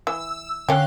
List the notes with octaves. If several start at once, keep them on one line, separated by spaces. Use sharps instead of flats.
E3 E6
D3 C#4 G4 F5 F#6